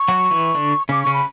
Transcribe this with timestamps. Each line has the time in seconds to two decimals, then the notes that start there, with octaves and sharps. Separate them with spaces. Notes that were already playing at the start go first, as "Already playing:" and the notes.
Already playing: C#6
0.08 F#3 F#4
0.31 E3 E4
0.54 D3 D4
0.89 C#3 C#4 D6
1.03 C#3 C#4 C#6
1.14 B5